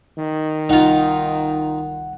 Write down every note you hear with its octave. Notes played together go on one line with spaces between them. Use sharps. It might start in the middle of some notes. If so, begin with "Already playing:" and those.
D#3
C2 D#4 F4 F#5